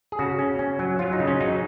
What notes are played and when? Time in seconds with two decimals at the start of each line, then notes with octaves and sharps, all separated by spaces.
0.12 G#4
0.19 C#3 F#4
0.39 C#4
0.59 C#4
0.79 F#3
0.99 F#3 F4
1.13 D#4
1.19 C#3
1.27 C#4
1.41 F#3 D#4